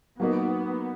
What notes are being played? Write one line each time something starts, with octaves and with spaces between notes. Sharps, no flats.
F#3 A#3 B3 D#4